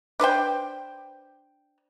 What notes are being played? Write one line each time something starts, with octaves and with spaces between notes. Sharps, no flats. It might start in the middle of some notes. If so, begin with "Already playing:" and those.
D4 B4 C5 G5